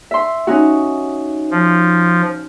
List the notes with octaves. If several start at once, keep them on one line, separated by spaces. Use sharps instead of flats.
E5 C6
C#4 D#4 F#4
F3